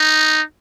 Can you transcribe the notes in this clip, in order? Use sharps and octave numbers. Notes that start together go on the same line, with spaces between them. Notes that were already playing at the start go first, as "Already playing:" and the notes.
Already playing: D#4